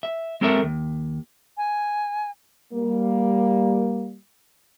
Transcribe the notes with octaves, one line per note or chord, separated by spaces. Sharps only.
E5
G#3 C4 A4 A#4 C#5 E5
D#2
G#5
G3 A#3